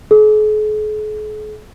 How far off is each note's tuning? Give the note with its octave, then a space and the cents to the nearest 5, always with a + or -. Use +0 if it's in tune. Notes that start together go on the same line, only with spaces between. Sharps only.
G#4 +45